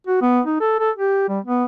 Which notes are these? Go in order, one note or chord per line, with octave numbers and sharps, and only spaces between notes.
F#4
B3
D#4
A4
A4
G4
G3
B3